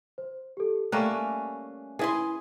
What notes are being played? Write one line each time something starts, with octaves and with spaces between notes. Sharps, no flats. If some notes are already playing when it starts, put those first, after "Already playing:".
C5
G4 A4
G3 A3 A#3 C#4 F#6
E3 E4 G#4 C6